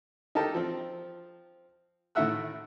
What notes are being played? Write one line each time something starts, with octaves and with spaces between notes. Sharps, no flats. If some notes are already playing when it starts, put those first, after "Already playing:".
D#4 G4 A4 A#4 A5
F3 C4
A2 D#3 A3 E5 F#5 E6